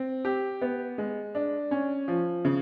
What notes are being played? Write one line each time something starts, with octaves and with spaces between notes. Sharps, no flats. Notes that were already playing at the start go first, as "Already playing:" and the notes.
Already playing: C4
G4
B3
G#3
D4
C#4
F3
C#3